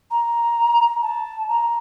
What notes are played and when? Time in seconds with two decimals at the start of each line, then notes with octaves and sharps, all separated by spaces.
0.11 A#5
1.02 A5
1.49 A#5